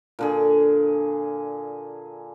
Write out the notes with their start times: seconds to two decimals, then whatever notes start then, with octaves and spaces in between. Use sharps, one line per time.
0.19 A#2 D3 G#4